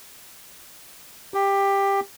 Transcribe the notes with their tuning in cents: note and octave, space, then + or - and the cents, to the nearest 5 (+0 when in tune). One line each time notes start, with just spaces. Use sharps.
G4 +15